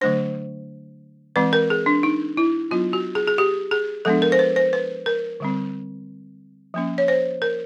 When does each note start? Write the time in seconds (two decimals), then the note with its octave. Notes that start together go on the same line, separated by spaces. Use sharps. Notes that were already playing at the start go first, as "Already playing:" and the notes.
0.01 D3 F#3 A3 D4 C5
1.36 E3 G#3 C4 B4
1.53 A#4
1.70 G#4
1.86 D4
2.03 D#4
2.37 E4
2.71 F#3 B3 D4 F4
2.93 F#4
3.15 G#4
3.28 G#4
3.38 G4
3.71 G#4
4.05 F3 G#3 B3 D4 A4
4.22 A#4
4.32 C5
4.39 B4
4.56 C5
4.73 B4
5.06 A#4
5.40 D3 G3 C4
6.74 F3 A#3 C#4
6.98 C#5
7.08 C5
7.42 A#4